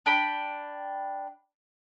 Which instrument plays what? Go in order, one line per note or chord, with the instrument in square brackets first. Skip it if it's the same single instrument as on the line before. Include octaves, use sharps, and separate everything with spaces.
[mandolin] D4 G5 B5